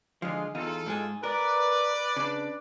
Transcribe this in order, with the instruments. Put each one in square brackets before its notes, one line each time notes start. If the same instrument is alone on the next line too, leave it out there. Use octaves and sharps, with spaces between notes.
[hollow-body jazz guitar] D3 F3 [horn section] G#3 F4
[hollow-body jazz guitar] E2 D#4 [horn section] F4 A4
[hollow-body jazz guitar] G#2 G#3 G#4
[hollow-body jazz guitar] A#4 [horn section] B4 D5
[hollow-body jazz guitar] C#3 D4